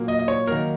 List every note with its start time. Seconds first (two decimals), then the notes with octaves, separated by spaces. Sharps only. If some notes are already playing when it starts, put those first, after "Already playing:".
Already playing: A#2 F#3 A#3
0.08 D#5
0.19 D#5
0.28 C#5
0.47 D#3 F#3 A#3 A#4